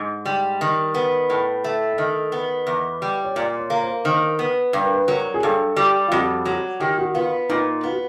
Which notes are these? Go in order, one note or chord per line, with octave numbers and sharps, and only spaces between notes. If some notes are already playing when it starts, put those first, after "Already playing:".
Already playing: G#2
G3
D#3
B3
A2
A3
E5
D#3 D#5
B3
E2
G3
C#5
A#2 D5
C#5
A#3
C5
D#3 C5
B3 B4
G2 B4
A#4
B4
F#3 A#4
G#4
G2 A4
G3 G4
F4
F2 F#4
F#3 F#4
D#3 G4
F#4
B3 F4
A#2 D#4
B3 F4
F#4